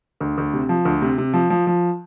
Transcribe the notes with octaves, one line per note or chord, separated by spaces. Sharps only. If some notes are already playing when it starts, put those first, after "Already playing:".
D2
D2
C3
F3
D2
C3
C3
F3
F3
F3